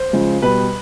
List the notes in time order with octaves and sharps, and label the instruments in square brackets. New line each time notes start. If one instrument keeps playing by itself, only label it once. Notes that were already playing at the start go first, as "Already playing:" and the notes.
Already playing: [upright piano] C5
C#3 F3 G#3
B2 G3 B4